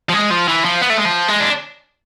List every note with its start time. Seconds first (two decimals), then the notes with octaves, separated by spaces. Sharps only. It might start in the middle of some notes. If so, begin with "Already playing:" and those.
0.09 F3
0.14 G#3
0.31 F3
0.48 E3
0.65 F3
0.81 B3
0.90 A3
0.97 G#3
1.05 F3
1.28 G#3
1.40 D4